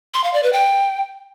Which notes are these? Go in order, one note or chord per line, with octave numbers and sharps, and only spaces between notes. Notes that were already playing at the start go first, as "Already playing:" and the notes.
C6
F5
D5
B4
G5